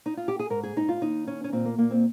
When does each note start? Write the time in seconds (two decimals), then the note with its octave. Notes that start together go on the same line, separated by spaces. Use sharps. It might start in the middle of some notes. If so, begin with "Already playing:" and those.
0.06 D#4
0.17 F4
0.28 G4
0.39 G#4
0.50 G#2 A#4
0.63 G#4
0.76 G#2 D#4
0.88 F4
1.01 D#2 D#4
1.26 D#3 C#4
1.44 C#4
1.52 A#2 C4
1.65 A#3
1.78 A#2 A#3
1.91 C4